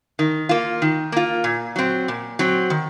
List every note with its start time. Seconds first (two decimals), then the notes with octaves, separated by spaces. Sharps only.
0.19 D#3
0.49 A#3 F4
0.82 D#3
1.12 A#3 F4
1.44 A#2
1.76 F#3 C4
2.08 A#2
2.39 F#3 C4
2.70 D#3